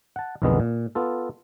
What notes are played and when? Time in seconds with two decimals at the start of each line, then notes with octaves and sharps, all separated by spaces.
0.16 F#5 A5
0.42 B1 F2 D3 D#3 G#3 B3
0.60 A#2
0.95 B3 F4 A4